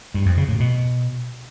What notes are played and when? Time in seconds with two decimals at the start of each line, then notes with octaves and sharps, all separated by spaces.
0.14 G2
0.26 F2
0.37 C#3
0.49 A2
0.60 B2